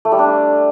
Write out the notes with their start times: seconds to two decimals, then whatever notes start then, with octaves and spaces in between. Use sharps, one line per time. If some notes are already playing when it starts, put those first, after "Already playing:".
0.05 A3
0.12 G3
0.19 D4